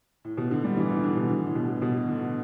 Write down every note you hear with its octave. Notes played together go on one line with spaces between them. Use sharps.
A2
B2
D3
G3
E3
E3
D3
B2
D3
A2
B2
B2
D3